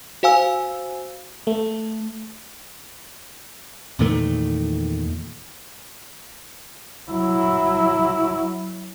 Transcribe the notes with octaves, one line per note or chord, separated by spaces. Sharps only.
F#4 C5 F5 G#5 E6
A3
E2 A#2 D#3 A3
F#3 E4